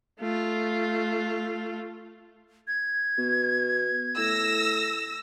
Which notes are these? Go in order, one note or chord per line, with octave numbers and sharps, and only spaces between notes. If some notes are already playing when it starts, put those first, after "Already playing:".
A3 F4
G#6
B2
A2 E6 A#6